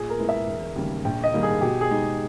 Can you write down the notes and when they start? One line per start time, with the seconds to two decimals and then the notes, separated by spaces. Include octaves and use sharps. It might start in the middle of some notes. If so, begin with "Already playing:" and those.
Already playing: A#2 G#4
0.10 A#4
0.19 G#3 B3 E4
0.29 E5
0.47 E1
0.76 D#2 C#3 G3
1.05 A#1 G5
1.24 D#5
1.33 G#2 D#3 G3 A#3
1.43 G#4
1.61 B2 G4
1.81 G#4
1.90 G#3 D#4